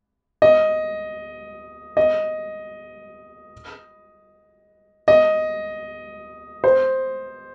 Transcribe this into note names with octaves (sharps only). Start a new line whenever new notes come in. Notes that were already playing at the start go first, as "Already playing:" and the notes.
D#5
D#5
D#5
C5